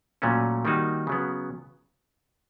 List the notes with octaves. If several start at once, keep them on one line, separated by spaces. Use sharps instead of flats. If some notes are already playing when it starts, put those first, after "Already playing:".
A#2 F#3 A3 C#4
D#3 G3 A#3 D#4 F#4
C#3 F#3 B3